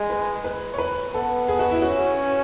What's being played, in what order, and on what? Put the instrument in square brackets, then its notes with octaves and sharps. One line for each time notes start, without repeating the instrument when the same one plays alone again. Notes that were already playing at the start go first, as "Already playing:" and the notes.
Already playing: [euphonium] G#3
[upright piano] B4
B4
C#5
B4
[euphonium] B3 [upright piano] A4
[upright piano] G#4
F#4
E4
[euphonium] C#4 [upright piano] F#4